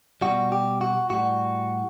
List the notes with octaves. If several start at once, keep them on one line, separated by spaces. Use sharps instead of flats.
B2 G3 F#4
G4
F#4
A2 G3 F#4